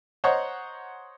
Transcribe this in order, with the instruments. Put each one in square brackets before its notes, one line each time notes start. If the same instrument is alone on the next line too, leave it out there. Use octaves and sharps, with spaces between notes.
[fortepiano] C5 C#5 D#5 F#5 A#5